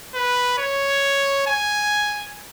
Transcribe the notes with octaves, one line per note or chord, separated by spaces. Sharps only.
B4
C#5
G#5